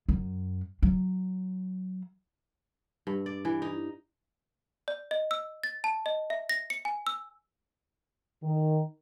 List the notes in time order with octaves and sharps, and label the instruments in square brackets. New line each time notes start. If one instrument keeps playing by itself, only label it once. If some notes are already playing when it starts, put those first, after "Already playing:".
[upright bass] F#2
F#3
[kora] G2
D5
E3
D#4
[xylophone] D5
D#5
E6
A6
A5
D#5
E5
A#6
C#7
G#5
E6
[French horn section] D#3